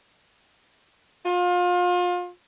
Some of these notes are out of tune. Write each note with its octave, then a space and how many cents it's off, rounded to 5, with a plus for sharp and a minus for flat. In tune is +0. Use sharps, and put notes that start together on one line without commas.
F4 +30